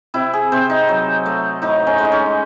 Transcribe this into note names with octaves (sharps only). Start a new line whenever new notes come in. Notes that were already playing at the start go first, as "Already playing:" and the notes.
C3 E4
G#4
C3 C5
D#4
F#3
A3
A2 D#4
C#4
G#3
D#4
C#4